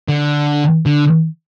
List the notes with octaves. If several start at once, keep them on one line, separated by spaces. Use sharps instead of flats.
D3
D3